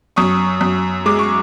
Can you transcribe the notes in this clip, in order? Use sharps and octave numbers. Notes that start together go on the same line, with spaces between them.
F#2 C#6 D#6
F#2
G#3 D6
C#6